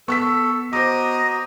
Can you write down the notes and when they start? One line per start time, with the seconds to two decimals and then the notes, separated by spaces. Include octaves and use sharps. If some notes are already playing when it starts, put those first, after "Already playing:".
0.08 B3 A4 C#6 E6 B6
0.73 F#4 C5 D#5 A#5 D6